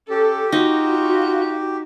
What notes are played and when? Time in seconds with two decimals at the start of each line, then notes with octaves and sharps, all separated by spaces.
0.10 C#4 G4 A4
0.52 D#4 F4 F#4